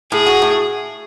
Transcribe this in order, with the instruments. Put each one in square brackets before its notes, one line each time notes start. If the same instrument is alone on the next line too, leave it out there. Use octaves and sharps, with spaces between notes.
[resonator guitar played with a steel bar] A2 [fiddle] G#4
[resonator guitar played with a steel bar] F#4
A2